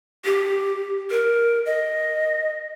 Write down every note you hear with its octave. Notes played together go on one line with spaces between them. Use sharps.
G4
A#4
D#5